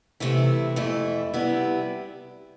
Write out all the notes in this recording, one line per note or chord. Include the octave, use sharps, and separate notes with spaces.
C3 E3 A3 E4
F2 E3 A3 E4
C3 G3 B3 E4